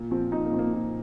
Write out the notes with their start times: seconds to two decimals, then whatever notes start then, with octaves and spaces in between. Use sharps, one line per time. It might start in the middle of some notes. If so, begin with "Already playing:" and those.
Already playing: A#2
0.11 F3 C4
0.32 A#2 D#4
0.45 A#3
0.52 F3 C4
0.59 A#3
0.73 A#2